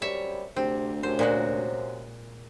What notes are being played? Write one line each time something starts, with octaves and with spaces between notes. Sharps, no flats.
F#2 C3 G3 C#5 E5
D2 C3 C4
F#2 C3 C5
A#2 G#3 F#4